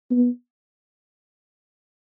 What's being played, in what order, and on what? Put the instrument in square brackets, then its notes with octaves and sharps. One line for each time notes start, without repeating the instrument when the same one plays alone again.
[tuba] B3